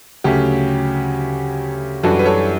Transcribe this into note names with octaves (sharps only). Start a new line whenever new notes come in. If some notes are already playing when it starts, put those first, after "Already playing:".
D2 C#3 F#3 A3 C#4 G4
F#2 E3 G3 D4 F#4 A4
B4
A4 C#5